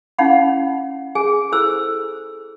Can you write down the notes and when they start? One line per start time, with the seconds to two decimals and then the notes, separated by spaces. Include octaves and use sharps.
0.18 C#4 D#4 E4 F5 F#5 B5
1.15 G#4 G#5
1.52 E4 A4 C5 E6